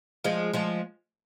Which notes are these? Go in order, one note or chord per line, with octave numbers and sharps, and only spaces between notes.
F3 G#3
F3 G#3